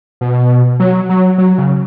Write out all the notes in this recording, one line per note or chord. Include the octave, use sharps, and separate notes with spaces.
B2
F#3
F#3
F#3
C#3